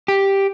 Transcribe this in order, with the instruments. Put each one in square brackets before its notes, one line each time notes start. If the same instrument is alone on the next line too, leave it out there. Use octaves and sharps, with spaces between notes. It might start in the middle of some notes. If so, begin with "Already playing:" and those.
[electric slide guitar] G4